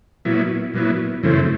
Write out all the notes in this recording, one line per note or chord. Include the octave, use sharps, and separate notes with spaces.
A#2 F#3 B3 E4
A#2 F#3 B3 E4
F#2 C#3 E3 A3 C4